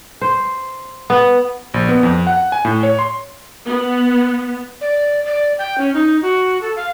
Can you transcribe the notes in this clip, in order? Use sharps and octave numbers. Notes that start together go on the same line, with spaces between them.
C5
B3
A#1
B3
F2
F#5
G#5
A2
C#5
C6
B3
D5
D5
G5
C#4
D#4
F#4
A4
F5